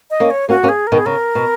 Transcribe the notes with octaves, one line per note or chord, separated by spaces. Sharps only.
D#5
A#3 C#4
C#5
A#3 C#4 F#4
A#3 C#4
G#4
A#4
B2 D#3
G#4
C#3 A#4
B2